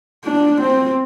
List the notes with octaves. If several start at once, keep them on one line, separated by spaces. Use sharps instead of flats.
D4
C4